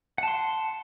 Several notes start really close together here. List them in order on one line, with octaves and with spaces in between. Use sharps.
F#5 A5 C6